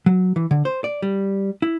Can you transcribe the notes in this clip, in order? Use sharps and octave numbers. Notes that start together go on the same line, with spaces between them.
F#3
E3
D3
C5
D5
G3
E4